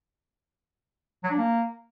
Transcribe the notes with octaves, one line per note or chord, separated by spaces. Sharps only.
F#3
D4
A#3